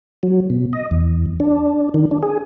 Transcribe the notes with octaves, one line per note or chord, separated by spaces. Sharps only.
F#3
B2
D#5
E2
D4
D#3
D4
G#4